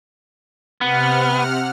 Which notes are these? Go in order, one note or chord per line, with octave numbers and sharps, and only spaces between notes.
C3 B3 F#5 F6